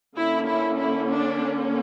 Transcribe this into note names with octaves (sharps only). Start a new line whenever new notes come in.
D3 A#3 C#4 E4
E4
E4
D4